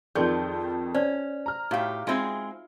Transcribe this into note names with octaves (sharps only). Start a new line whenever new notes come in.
F2 D#3 F3 G#4 D5 G5 G6
C#4 C5 D5
A#5 F6
A2 D#4 F#4 G4 F5
G#3 C4 D#4 F4 G#4 E5